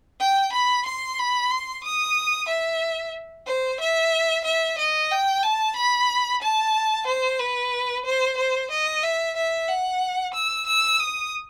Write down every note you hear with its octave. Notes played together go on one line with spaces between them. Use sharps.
G5
B5
C6
B5
C6
D#6
E5
C5
E5
E5
D#5
G5
A5
B5
A5
C5
B4
C5
C5
D#5
E5
E5
F#5
E6
E6
D#6